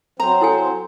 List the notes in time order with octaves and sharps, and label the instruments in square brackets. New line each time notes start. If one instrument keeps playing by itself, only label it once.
[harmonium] F#3 C4 C5 [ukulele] A#5
[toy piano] E4 A4 G#5